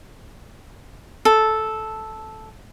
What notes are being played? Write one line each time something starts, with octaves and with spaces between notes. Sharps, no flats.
A4